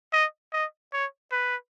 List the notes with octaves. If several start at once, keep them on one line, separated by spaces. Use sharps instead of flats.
D#5
D#5
C#5
B4